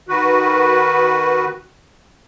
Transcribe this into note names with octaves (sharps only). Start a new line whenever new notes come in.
D#3 F#4 B4